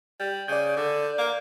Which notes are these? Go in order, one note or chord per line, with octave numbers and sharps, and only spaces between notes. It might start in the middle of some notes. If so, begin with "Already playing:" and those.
G3
C#3 D5 G6
D3
A#3